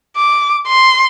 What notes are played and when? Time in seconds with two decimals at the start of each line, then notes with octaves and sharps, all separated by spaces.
0.17 D6
0.68 C6